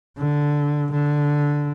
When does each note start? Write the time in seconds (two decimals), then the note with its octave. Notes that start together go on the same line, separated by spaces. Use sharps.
0.19 D3
0.92 D3